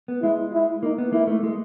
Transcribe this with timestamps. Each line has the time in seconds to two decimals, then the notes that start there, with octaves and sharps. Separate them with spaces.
0.08 B3
0.23 G#3 E4
0.53 E4
0.83 A#3 D#4
0.98 B3
1.13 A#3 E4
1.27 A3
1.43 G#3